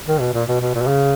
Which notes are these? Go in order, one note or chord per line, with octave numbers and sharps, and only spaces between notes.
D#3
B2
A#2
B2
B2
A#2
B2
C#3